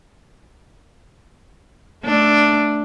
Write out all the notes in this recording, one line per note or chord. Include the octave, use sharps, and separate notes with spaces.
A3 D4